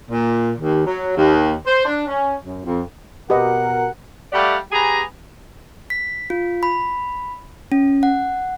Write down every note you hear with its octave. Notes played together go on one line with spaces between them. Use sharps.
A#2
D#2
F#3
D#2
C5
D4
C#4
F#2
F2
B2 F#4 G4 A#4 B4 D#5 F#5
G3 A3 G4 D5 F5 F#5
B3 G4 G#4 G#5 A#5
B6
F4
B5
C#4
F#5